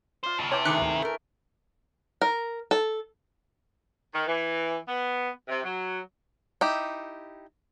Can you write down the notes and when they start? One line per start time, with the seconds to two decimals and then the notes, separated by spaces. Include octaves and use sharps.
0.24 F4 C5 D5
0.39 D#2 C#3 D#5 A5
0.52 C3 E3 C#5 G5 D6
0.65 D#3 A3 G#4 B5 D6 F#6 C#7
0.78 D2 G#2
1.02 A3 A#4
2.22 A#4
2.71 A4
4.13 D#3
4.27 E3
4.88 B3
5.48 C3
5.64 F#3
6.61 D#4 E4 G4